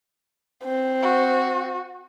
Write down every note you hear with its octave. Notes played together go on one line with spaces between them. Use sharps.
C4
F#4